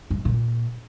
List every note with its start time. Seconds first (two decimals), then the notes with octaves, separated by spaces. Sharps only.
0.10 G#2
0.25 A#2